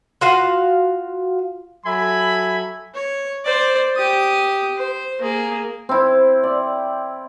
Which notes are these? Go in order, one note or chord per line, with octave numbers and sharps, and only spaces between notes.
F4 F#4 F5
F#3 A4 E5 G#5 B5
C#5
C5 D5
G4 D#6
C5
A#3 G#4
C4 E4
D5